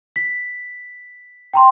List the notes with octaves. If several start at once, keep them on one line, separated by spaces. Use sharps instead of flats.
B6
G5 A#5 C6